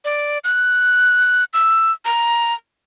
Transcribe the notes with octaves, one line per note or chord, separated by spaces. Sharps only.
D5
F#6
E6
A#5